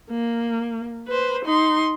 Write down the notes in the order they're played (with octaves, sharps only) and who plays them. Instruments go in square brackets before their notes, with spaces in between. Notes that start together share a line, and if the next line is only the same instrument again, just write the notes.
[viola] A#3
B4 C5
D#4 C6